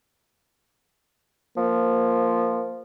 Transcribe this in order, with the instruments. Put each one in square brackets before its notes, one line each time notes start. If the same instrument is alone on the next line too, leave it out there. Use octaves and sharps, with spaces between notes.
[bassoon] F3 [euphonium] A#3